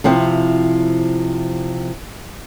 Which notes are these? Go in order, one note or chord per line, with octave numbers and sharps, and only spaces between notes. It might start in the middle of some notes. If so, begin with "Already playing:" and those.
C3 F3 C4 E4